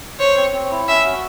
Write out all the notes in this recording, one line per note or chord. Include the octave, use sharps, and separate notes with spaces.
C5 C#5
C4
C4
E4
C#4 E5
F#4